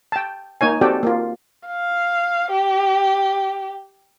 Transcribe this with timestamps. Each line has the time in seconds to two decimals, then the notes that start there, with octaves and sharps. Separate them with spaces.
0.12 G5 A5
0.61 A#3 D#4 C#5 G#5
0.81 C4 F#4 G4 A4 D5 G5
1.03 A#3 F4
1.67 F5
2.51 G4